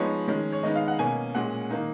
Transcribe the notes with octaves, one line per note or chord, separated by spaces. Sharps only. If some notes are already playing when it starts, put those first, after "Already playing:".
Already playing: F3 G#3 B3 D#4 C#5
D#3 G#3 C#4
C#5
D#3 G#3 B3 D#4 D#5
F5
F#5
B2 A#3 C#4 G#5
A#2 G#3 C#4 F#5
D#3 A#3 D#4